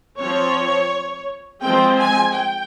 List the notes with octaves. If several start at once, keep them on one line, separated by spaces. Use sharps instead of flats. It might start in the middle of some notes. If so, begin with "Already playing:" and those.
F3 C4 C#5
F3 G#3 C4 G5
G#5
G5